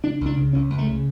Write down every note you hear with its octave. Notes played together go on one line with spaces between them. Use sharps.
C#3 D4
C#2 D4
C#3
C#2 C#4
C#2
A3
C#3